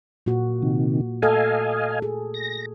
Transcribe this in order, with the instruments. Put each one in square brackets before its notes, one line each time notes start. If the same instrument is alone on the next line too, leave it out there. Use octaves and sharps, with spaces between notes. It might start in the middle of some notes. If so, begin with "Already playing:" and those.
[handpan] A#2 A#3 F#4
[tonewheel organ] C3 D#3
[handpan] A3 A4 [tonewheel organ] D#5 F5 G#5
[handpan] G#4
[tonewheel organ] A#6